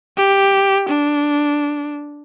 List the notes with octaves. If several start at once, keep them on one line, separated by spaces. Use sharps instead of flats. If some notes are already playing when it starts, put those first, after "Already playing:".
G4
D4